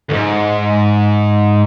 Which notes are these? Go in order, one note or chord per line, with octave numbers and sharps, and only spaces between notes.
D2 G#2